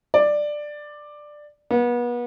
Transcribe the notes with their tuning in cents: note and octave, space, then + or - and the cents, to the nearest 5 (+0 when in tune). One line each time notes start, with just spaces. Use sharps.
D5 +10
B3 -35